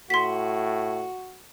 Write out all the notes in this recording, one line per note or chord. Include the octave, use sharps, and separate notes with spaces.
A2 F#4 C6 B6